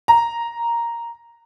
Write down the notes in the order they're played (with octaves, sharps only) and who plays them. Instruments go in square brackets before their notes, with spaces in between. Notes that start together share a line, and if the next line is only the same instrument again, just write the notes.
[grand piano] A#5